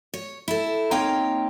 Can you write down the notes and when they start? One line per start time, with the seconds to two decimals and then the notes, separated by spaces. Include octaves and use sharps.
0.14 C#5
0.48 E4 A4
0.91 A#3 C4 D#4 C#5 F5 G5